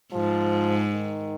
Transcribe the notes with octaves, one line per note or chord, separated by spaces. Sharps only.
G#2 F3
D#3